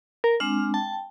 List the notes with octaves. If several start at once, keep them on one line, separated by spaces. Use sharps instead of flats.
A#4
G#3 C4 D4 F6
G5 A5